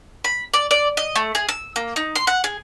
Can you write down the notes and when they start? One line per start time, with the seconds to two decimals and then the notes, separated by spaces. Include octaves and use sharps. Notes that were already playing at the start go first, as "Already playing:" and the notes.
0.24 B5
0.54 D5
0.71 D5
0.97 D#5
1.16 A3
1.35 G#4
1.49 E6
1.76 A#3
1.96 D#4
2.15 C6
2.27 F#5
2.44 G#4